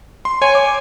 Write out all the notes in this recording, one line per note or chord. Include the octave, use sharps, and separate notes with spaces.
C6
C#5 G#5
D6